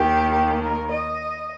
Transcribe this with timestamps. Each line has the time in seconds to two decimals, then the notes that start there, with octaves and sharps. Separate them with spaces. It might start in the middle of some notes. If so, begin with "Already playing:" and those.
Already playing: D#2 D#3 G4
0.32 G4
0.62 A#4
0.91 D#5